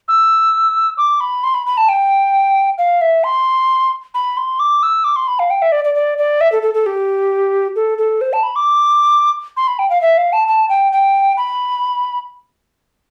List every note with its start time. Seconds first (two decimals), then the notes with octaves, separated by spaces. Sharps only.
0.08 E6
0.98 D6
1.20 B5
1.44 C6
1.54 B5
1.67 B5
1.77 A5
1.89 G5
2.78 F5
3.01 E5
3.24 C6
4.14 B5
4.37 C6
4.60 D6
4.83 E6
5.04 D6
5.16 C6
5.28 B5
5.39 F5
5.50 G5
5.62 E5
5.72 D5
5.85 D5
5.95 D5
6.18 D5
6.41 E5
6.52 A4
6.62 A4
6.74 A4
6.86 G4
7.76 A4
7.98 A4
8.21 C5
8.33 A5
8.43 B5
8.56 D6
9.57 C6
9.68 B5
9.79 G5
9.90 F5
10.02 E5
10.18 F5
10.33 A5
10.48 A5
10.69 G5
10.92 G5
11.37 B5